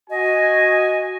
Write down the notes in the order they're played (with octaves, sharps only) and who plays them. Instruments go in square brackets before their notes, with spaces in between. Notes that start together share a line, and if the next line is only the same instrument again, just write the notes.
[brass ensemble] F#4 G#5 [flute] D#5